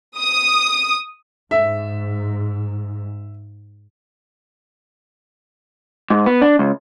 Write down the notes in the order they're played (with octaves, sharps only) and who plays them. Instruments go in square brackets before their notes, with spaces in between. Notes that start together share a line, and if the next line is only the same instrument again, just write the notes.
[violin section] D#6
[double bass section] G#2 [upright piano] E5
[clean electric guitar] G#2
B3
D4
C#2